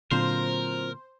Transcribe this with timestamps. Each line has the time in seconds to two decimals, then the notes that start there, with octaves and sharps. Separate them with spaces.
0.11 A#2 D3 F#3 C4 F4 A#4 C5